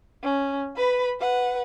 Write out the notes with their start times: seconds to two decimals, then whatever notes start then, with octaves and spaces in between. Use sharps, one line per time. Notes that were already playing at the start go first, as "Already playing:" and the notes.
0.23 C#4
0.76 B4 B5
1.20 B4 F#5